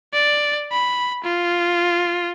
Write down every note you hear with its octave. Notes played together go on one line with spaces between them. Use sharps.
D5
B5
F4